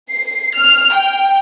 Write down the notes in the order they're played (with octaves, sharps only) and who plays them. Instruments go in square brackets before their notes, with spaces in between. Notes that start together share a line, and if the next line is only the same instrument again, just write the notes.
[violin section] C7
F6
G5